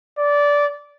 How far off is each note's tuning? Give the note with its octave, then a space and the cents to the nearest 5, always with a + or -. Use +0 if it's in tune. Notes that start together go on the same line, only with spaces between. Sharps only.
D5 -15